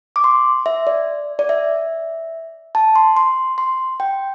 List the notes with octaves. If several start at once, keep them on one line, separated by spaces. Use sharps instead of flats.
D6
C6
E5
D5
D5
E5
A5
C6
C6
C6
G5